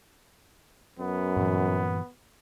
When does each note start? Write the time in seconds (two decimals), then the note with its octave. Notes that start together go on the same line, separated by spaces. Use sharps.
0.99 F#2 B3
1.37 G2 A#2 E3